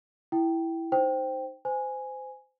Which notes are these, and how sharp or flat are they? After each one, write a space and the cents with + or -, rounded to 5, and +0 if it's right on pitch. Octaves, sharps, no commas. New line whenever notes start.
E4 +0 G5 -10
D#4 +0 C5 +0 G5 +0
C5 -25 G#5 +0